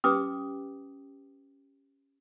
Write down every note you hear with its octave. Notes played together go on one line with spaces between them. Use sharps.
C#4 G4 B4 G5 D6 D#6